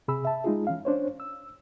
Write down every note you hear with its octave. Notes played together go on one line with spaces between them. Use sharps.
C3 G#4 B5 E6
E5 A5
G#3 D#4 F4 G#4
E3 C#4 F5
C#4 D4 C5 C#5
E6